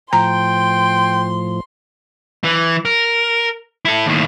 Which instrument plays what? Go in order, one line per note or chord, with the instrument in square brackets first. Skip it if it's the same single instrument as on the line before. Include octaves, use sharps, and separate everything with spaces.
[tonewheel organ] A2 F3 [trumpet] G5 [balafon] A#5 [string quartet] C6
[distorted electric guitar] E3
A#4
E4 A4
D#2 A2